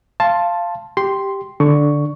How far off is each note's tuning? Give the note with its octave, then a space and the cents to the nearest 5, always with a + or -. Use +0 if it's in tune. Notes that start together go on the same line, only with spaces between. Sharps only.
F5 -10 A5 +0 C6 +10
G4 +0 C6 +0
D3 +0 C#6 +5